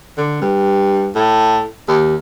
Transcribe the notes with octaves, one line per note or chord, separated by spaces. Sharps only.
D3
G2
A2
D#2